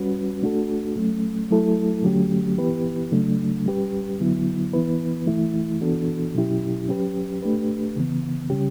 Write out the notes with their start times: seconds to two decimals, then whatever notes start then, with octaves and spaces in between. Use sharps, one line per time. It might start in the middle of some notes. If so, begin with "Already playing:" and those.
Already playing: G3 C#4 F#4 B4
0.43 A3 D4 F#4 A4
0.97 F#3 A3 C#4
1.51 F#3 A3 E4 A4
2.04 D3 F#3 A3 C#4 G4
2.58 E3 B3 E4 G4 B4
3.12 C#3 F#3 A3 D4
3.66 G3 C#4 G4 B4
4.20 D3 F#3 B3 E4
4.74 E3 B3 E4 B4
5.27 E3 A3 E4
5.81 E3 B3 D4 F#4 A4
6.35 B2 F#3 C#4 E4 G4
6.89 F#3 C#4 G4 B4
7.42 A3 D4 G4 B4
7.96 C#3 E3 B3
8.50 C#3 G3 C#4 G4